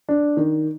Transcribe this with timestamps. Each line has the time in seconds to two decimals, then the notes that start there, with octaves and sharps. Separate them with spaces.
0.09 D4
0.37 D#3